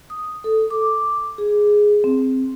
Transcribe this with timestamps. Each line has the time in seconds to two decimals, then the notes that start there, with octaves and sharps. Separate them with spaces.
0.10 D#6
0.44 A4
0.70 D6
1.38 G#4
2.04 C4